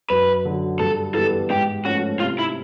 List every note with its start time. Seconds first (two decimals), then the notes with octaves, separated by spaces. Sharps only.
0.10 F#2 B4
0.45 D3 F#3
0.80 G2 A4
1.15 E3 G3 B3 A4
1.50 G#2 G4
1.85 F3 A3 C#4 F#4
2.20 C3 F4
2.39 E4